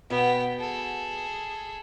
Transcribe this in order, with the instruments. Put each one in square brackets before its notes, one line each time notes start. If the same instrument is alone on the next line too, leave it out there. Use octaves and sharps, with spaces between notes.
[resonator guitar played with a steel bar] B2 F#4 F#5 [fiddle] B3 G5
[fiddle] G#4 A4